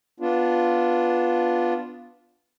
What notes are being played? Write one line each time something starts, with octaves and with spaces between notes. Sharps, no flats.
B3 D4 F4